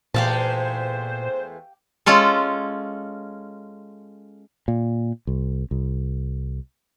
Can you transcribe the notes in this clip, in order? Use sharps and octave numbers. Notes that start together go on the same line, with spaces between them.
E2 A#2 G#3 A3 G4 C5 F5 A5
G#3 C#4 F4 A4
A#2
C2
C2